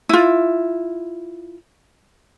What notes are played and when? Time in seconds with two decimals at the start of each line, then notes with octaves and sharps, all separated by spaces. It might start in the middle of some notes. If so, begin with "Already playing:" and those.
0.09 E4 F4